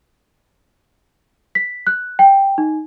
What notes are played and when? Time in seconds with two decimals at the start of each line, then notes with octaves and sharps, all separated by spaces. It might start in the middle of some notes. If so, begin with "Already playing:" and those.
1.55 B6
1.87 F#6
2.19 G5
2.58 D#4